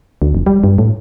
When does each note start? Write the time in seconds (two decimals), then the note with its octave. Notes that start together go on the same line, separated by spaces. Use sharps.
0.22 D2
0.35 F1
0.46 G3
0.64 G2
0.78 A2